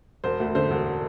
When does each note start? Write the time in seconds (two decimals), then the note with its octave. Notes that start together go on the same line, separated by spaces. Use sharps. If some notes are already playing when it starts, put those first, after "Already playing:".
0.24 E1 C5
0.40 D2
0.55 D3 C5
0.71 E1